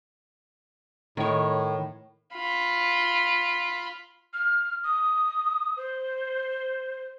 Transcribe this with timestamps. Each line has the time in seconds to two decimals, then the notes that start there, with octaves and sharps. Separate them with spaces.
1.17 A2 D#3 C#5
2.34 F4 B5
4.34 F6
4.84 D#6
5.77 C5